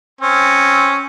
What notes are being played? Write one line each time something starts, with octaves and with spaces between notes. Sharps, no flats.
C4 C#4